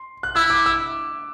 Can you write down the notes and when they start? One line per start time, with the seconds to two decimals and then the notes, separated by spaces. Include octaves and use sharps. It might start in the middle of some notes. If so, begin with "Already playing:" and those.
Already playing: C6
0.23 F#6
0.35 E4 E6
0.50 D6
0.66 E6